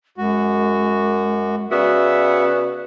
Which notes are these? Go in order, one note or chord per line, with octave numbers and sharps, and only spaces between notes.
F#2 G#3 F#4
C#3 B3 F#4 D5 E5